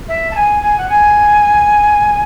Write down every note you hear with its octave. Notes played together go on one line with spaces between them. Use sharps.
E5
A5
G#5
G#5
F#5
G#5